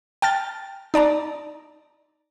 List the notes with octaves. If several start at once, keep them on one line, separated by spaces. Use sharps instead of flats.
G5 A5 F6 A6
D#4 D5 A5 A#5